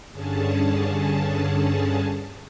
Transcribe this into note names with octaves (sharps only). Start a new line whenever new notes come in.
G2 D3 C#4 G#4 A5